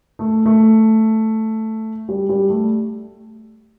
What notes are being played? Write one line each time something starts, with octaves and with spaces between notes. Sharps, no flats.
A3
A3
G3
G3
A3